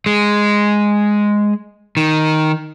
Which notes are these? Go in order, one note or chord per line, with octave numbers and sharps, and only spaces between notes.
G#3
D#3